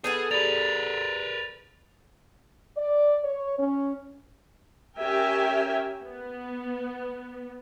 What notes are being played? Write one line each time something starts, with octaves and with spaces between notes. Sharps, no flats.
B3 G#4 A4 F#5 G6 G#6 D#7
G4 G#4 A#4 B4 D5 A6 F7
D5
C#5
C#4
C#4 G4 A#4 E5 G5 G#5
B3